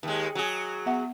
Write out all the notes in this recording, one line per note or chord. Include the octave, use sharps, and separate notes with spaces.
D#2 G#3
F#3 G#4
B3 E5 F#5